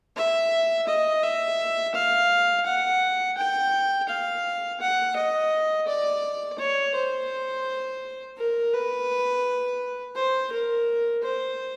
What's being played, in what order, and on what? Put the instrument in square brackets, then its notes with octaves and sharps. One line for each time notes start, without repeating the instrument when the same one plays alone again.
[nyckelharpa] E5
D#5
E5
F5
F#5
G5
F5
F#5
D#5
D5
C#5
C5
A#4
B4
C5
A#4
C5